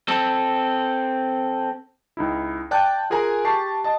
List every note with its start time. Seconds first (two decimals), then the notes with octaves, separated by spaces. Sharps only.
0.08 C4 A4
2.17 C#2 D#4 E4
2.71 D5 G5 A5 F#6
3.10 F4 G#4 A#4 G#5 A#5
3.45 G4 A5 C#6 C7
3.84 D#5 A5